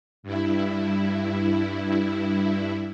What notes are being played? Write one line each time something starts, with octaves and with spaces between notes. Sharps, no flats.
G2 E4